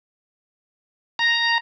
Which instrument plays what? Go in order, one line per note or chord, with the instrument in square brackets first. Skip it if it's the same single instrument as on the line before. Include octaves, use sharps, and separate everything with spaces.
[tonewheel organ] A#5